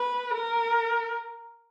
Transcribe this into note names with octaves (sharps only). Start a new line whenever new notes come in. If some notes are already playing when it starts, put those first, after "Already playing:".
Already playing: B4
A#4